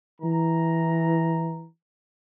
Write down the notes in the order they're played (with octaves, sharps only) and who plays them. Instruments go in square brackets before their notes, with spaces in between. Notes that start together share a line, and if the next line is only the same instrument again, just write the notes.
[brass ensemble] E3 A#5